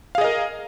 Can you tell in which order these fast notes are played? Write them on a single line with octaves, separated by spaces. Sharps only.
F5 G#4 D#5 A#4